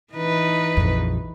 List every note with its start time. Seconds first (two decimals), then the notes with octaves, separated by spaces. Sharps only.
0.13 E3 D#4 B4
0.77 A#1 F2